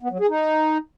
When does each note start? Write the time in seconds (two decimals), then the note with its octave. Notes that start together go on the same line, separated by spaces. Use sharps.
0.02 B3
0.11 F#3
0.20 G#4
0.29 D#4